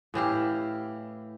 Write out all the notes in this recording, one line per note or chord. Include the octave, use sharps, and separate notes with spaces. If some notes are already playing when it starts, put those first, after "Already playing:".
A2 E3 G4 F5